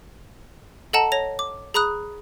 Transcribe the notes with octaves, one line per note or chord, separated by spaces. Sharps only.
A4 D#5 F#5 A5 A#5
C#5 A#6 F7
D6
G#4 A#5 B5 D#6 F#6